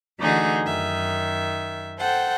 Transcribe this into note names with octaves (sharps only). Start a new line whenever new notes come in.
D3 E3 A3 D#4 F#4 G#4
F#2 D#3 E5
A4 C5 F#5 G5